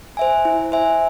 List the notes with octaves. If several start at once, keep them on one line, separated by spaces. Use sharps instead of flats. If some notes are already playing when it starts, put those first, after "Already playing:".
C5 E5 G#5
E4
C5 E5 G#5